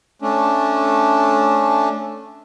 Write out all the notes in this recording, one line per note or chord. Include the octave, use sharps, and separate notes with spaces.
A3 C#4 D4